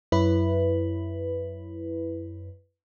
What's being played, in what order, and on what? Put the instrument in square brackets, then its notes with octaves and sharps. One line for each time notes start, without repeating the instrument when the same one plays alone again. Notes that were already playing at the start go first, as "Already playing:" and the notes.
[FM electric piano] F#2 E4 B4